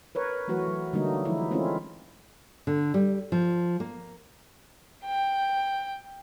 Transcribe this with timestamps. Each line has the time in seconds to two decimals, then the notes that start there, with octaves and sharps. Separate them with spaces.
0.15 A#4 B4 C#5
0.48 E3 F#3 A3 F#4 B4
0.68 F#3
0.93 D3 F#3 G3 A3 A#3 D#4
1.25 E3 F3 G#3 D#4 E4
1.51 G#3 A3 C4 C#4 E4 F4
2.67 D3
2.94 G3
3.32 F3
3.80 A#3
5.05 G5